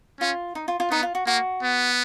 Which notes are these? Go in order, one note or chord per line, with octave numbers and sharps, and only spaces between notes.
C#4 F4
D#4
F4
F4
B3 D#4
F4
F#4
A#3 F#4
B3